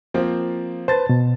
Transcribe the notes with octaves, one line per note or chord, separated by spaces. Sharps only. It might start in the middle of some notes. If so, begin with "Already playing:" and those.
F3 A#3 C4
B4 C5 A5 A6
B2